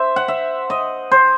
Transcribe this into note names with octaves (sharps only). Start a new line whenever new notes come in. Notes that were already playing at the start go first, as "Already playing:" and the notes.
Already playing: C5 E5
F#5
E5
D#5
C5